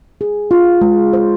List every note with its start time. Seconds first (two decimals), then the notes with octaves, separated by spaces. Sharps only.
0.21 G#4
0.51 F4
0.81 G#3
1.13 C5